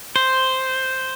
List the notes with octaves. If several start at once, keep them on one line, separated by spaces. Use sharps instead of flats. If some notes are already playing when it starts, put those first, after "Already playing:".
C5